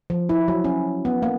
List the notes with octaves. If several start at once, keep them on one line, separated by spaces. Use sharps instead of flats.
F3
E4
F#3
C#4
B3
A#3